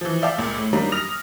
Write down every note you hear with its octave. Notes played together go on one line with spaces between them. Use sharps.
E3 F3
D5 E5 F5 G5 A5 D6
C#2 A#2
A2
F#3 G3 A#3 D4 D#4
D#6 F6 A#6 F7